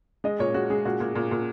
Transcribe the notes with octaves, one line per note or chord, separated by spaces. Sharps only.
G#3 D#5
A#2 C#5
G#3 F#4
G#3 G#4
A#2 F#4
A#2
A#2
A#2